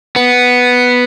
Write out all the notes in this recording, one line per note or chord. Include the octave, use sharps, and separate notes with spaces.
B3